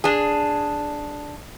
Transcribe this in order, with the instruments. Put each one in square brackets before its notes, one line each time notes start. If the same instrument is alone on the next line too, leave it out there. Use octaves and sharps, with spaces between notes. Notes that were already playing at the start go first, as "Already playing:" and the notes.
[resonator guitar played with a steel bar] D4 G#4